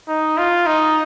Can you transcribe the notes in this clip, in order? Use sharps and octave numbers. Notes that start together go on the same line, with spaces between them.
D#4
F4
D#4